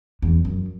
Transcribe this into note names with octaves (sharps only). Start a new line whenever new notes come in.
E2
F#2